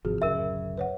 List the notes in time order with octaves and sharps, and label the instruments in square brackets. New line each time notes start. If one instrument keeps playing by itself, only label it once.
[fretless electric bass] G#1 C3 F3 [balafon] F#4 G#4
[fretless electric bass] D1 F#2 C#3 [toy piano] A#4 E5
[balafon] B4 C#5 F#5